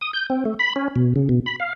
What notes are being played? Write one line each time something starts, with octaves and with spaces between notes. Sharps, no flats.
D#6
G6
C4
A3
B5
C#4
B2
C#3
B2
B5
F5